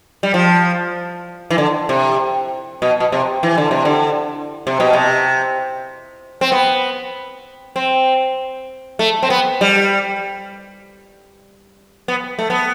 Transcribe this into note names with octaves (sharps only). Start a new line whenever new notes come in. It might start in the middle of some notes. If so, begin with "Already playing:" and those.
G3
F3
E3
D3
C3
B2
B2
C3
E3
D3
C3
D3
C3
B2
C3
C4
B3
C4
A3
C4
B3
G3
B3
A3
B3